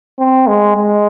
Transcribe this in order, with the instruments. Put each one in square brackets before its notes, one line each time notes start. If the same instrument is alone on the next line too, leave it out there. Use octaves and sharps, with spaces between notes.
[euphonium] C4
G#3
G#3